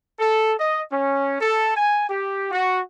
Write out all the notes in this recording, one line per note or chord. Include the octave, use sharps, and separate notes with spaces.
A4
D#5
C#4
A4
G#5
G4
F#4